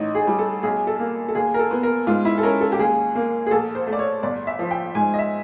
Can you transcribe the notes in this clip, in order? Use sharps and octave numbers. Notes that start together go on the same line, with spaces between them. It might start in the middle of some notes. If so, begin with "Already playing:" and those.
Already playing: A1 D#4
G#4
G3
A4
B1 G#4
A4
A#3
A4
D#2 G#4
A#4
A4
B3
A#4
G#2 F4
E4
A4
C#4 A#4
A4
G4
D#2 G#4
A#3
G#4
A#1 A4
C5
A3
D5
C#5
G1 D5
E5
F3
G5
G#2 G#5
D#5
E5